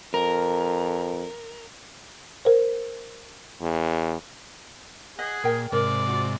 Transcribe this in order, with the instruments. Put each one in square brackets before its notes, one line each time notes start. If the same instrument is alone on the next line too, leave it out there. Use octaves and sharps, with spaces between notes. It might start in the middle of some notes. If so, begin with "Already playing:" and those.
[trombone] F2 [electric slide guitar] A#4
[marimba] A#4 C5
[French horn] E2
[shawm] G#4 [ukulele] D#5 [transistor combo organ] F#5
[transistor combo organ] A#2 [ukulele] A#4 G5
[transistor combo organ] G#2 C3 [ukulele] A#4 [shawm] D5
[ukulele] F4 F#4